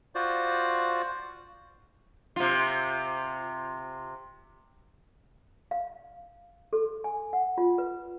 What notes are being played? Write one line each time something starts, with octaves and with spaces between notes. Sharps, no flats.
F4 F#4 C5 D5
C3 F4
F5
A4
G#5
F#5
F4
B4